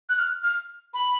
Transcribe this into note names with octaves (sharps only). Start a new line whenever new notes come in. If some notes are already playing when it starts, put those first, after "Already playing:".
F#6
F6
F6
B5